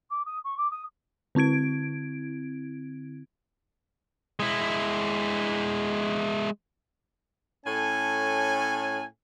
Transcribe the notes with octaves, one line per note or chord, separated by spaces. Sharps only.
D6
D#6
C#6
D6
D#6
D3 C4 E4 G#6 D7
G#3 E4
A2 C#4 A4 G#5